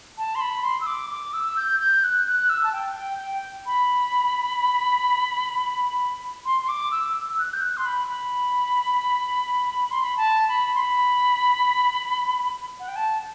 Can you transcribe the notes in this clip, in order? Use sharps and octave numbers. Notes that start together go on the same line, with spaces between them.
A5
C6
B5
C6
E6
D6
D6
E6
G6
G6
F#6
F#6
E6
A5
G5
G5
G5
B5
C6
C6
D6
E6
E6
F#6
G6
F#6
C6
B5
B5
C6
B5
A5
B5
C6
B5
F#5
G5
A5